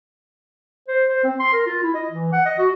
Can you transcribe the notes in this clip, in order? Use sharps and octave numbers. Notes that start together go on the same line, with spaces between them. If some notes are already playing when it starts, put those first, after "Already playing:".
C5
C5
C4
C6
A#4
F4
E4
D#5
E3
F#5
D#5
F#4